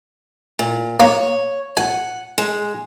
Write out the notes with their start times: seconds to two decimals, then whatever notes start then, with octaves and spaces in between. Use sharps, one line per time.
0.59 A#2
1.00 A#3 C#5
1.77 F#5 G#5
2.38 G#3